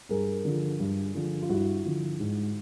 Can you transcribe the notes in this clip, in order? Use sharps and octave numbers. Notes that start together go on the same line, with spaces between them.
G2 G#4 A#4
D3 F3
G2
D3 F3
F4
G2 E4 F#4
D3 F3
G#2